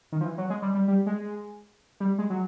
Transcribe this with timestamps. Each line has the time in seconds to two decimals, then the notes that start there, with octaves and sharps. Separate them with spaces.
0.12 D#3
0.21 F3
0.25 E3
0.38 F#3
0.50 G#3
0.62 G3
0.75 G3
0.88 G3
1.06 G#3
2.00 G3
2.18 G#3
2.30 F#3